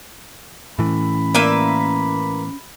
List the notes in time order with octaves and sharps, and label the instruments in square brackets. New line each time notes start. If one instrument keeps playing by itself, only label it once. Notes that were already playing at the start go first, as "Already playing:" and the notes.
[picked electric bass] A2 E3 [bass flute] C#4 [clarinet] B5
[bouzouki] A#3 B4 E5